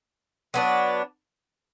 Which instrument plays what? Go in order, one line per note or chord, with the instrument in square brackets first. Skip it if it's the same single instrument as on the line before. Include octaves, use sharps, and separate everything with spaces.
[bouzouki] F#3 B3 D4